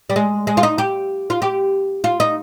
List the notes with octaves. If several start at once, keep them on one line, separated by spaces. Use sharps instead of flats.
G3
G#3
G#3
F4
D#4
G4
F4
G4
F4
D#4